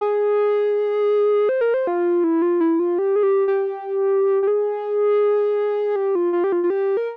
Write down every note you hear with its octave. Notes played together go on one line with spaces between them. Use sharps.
G#4
C5
A#4
C5
F4
E4
F4
E4
F4
G4
G#4
G4
G4
G4
G#4
G4
F4
F4
G4
F4
F4
G4
A#4